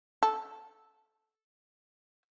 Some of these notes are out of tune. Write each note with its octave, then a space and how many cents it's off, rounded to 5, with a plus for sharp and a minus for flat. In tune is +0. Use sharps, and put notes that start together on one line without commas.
A4 -10